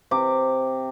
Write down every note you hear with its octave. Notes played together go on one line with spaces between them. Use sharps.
C3 D6